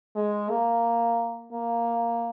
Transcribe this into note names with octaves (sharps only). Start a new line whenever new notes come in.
G#3
A#3
A#3